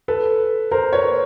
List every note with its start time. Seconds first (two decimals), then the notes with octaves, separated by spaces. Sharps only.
0.08 A4 B4
0.71 A#4 C5
0.93 B4 C#5